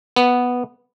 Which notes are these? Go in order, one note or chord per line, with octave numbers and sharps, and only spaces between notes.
B3